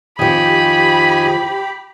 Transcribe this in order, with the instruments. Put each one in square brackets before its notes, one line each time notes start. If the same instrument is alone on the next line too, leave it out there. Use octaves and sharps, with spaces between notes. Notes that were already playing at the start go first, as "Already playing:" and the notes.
[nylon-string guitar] F2 F3 [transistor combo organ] D#3 G#4 D#5 [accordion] G4 [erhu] B5